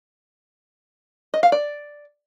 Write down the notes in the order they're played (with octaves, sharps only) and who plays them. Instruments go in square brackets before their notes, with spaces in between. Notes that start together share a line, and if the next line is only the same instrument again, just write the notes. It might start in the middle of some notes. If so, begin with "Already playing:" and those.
[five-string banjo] D#5
F5
D5